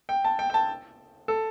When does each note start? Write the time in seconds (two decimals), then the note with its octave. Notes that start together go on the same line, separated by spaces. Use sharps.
0.09 G5
0.25 A5
0.39 G5
0.50 G5
0.54 A5
1.28 A4